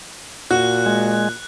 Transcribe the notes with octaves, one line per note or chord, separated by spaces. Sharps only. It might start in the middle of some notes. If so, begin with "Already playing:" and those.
A#2 F#4 F#6
G#3